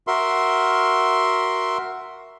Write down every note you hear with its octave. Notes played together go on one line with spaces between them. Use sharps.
F#4 A#4 E5 C6